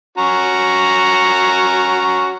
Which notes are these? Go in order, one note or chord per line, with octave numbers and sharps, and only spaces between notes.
C#4 F#4 A#5